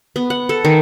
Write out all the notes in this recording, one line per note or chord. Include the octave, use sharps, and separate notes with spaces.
B3
F#5
A4
D#3